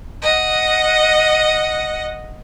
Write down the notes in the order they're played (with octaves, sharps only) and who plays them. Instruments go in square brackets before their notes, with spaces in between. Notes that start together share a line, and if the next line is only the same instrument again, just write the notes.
[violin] D#5 F#5